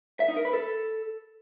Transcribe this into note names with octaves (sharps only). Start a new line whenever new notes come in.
E5
D#4
A#4
B4
A4